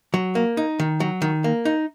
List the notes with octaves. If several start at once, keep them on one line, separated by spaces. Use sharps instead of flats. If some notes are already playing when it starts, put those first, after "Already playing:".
F#3
A#3
D#4
D#3
F#3
D#3
A#3
D#4